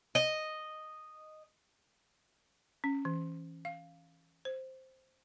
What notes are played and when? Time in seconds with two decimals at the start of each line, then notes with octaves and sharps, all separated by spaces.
0.15 D#5
2.84 C#4
3.05 E3
3.65 F5
4.45 C5